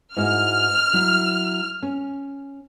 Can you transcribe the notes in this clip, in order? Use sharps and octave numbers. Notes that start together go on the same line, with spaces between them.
G#2 E4 F#4 F6
F#3 E4
C#4